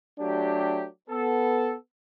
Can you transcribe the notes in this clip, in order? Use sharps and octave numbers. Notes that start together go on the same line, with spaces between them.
F#3 A3 D4 G4
B3 A4